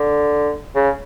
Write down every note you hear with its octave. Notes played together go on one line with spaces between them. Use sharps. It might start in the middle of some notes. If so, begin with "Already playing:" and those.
Already playing: D3
C#3